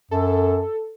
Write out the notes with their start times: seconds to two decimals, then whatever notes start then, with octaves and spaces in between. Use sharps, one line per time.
0.11 F#2 A4